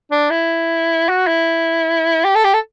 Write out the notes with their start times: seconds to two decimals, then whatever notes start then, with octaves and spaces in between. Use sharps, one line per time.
0.11 D4
0.31 E4
1.09 F#4
1.27 E4
2.24 G4
2.35 A4
2.44 G4
2.53 A4